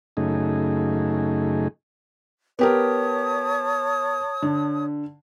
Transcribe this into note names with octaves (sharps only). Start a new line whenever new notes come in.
F#2 C#3 A3 D#4 G#4
B3 G4 A#4 C#5 A5 D#6
D3